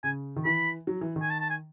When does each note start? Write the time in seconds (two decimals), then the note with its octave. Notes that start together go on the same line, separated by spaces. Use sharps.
0.04 C#3 G#5
0.36 D#3
0.45 E3 B5
0.87 F#3
1.01 E3
1.16 D#3
1.22 G#5
1.30 A5
1.40 A5
1.50 G#5